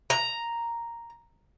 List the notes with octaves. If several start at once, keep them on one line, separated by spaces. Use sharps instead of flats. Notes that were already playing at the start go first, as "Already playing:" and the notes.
A#5